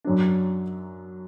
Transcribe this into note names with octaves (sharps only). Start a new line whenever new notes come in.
F#2 F#3 D4